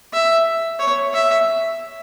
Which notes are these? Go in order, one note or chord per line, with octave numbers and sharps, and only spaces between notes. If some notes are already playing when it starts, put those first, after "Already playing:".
E5
C#5
E5